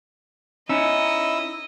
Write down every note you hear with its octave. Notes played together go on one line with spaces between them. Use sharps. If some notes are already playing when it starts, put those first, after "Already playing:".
C#4 D#4 E4 D#5 E6